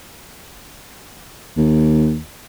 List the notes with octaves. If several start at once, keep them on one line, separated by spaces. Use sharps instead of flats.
D#2